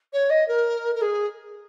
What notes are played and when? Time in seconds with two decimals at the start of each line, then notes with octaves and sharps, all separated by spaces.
0.12 C#5
0.29 D#5
0.47 A#4
0.94 A#4
1.01 G#4